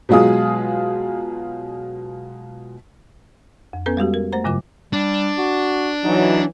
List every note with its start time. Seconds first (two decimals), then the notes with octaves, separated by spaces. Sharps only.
0.09 B2 F#3 G#3 F4 G#4 D#6
3.73 F2
3.86 B3 C#4 A4 B4
3.97 G3 G#3 F#4 G4
4.14 A#4
4.32 A3 C5 A#5
4.44 G2 C#3 F#3 F4 D6
4.93 G3 D4
5.38 F#4
6.04 E3 F#3 D#4